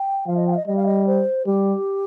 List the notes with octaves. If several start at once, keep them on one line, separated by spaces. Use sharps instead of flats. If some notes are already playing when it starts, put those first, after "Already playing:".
Already playing: G5
F3 F5
D#5
G5
F5
D#5
G3 D#5
F5
D#5
C5
G3 G4